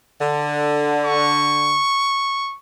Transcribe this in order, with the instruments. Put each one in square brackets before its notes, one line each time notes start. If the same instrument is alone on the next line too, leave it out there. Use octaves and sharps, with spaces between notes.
[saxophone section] D3
[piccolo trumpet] C#6